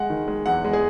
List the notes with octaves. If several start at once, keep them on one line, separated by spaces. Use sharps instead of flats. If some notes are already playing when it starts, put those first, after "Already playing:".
Already playing: G#3 F#5
D#3
G#3
E2 F#5
G#3
G#4